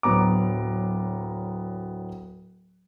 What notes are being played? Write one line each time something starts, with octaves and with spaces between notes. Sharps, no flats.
D1 F#3 B3 A#5 D6